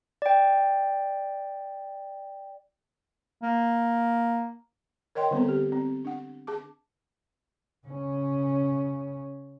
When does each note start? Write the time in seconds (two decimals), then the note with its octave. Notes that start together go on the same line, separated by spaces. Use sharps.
0.22 D5 G5
3.43 A#3
5.15 A#4 C#5 D#5 G5 C6
5.31 D3 G3 B3 C4 A4
5.48 G4
5.72 C4
6.05 D4 F#5
6.47 G#4 A5 D6
7.87 C#3 C#4